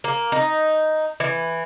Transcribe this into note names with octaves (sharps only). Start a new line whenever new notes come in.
A#3
D#4
E3